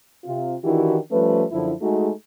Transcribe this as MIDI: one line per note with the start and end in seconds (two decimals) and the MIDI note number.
0.24 0.54 48
0.24 0.54 65
0.62 0.97 51
0.62 0.97 52
0.62 0.97 62
0.62 0.97 64
0.62 0.97 66
0.62 0.97 67
1.11 1.42 53
1.11 1.42 55
1.11 1.42 57
1.11 1.42 61
1.11 1.42 71
1.51 1.71 42
1.51 1.71 50
1.51 1.71 53
1.51 1.71 64
1.81 2.09 56
1.81 2.09 57
1.81 2.09 63
1.81 2.09 66
1.81 2.09 68